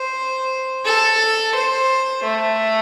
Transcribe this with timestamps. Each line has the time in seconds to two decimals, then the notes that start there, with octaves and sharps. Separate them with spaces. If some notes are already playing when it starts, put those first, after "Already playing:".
Already playing: C5
0.85 A4
1.55 C5
2.23 A3